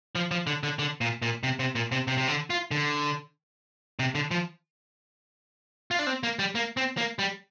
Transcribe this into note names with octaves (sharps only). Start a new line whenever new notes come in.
F3
F3
D3
D3
D3
A#2
A#2
C3
C3
A#2
C3
C3
C3
D3
F4
D3
C3
D3
F3
F4
D4
C4
A#3
G3
A#3
C4
A#3
G3